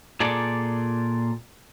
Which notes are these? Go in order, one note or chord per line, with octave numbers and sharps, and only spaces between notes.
A#2 G#4 A4 D5